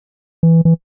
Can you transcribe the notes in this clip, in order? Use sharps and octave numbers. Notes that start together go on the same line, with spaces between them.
E3
E3